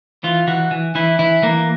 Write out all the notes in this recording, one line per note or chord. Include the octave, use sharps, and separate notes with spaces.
E3 F4
E3 F#4
E3
E3 E4
E3 E4
E3 A#3